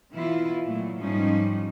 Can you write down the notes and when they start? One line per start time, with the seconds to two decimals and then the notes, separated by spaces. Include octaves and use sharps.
0.12 B2 E3 E4 F4
0.66 A#2 F#3 A3
0.99 G#2 F3 G3 C#4 D#4